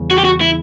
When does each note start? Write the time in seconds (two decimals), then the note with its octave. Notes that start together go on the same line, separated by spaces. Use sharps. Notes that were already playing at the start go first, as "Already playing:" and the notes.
Already playing: E2 C#3 G3
0.11 F#4
0.18 G4
0.24 F#4
0.41 E4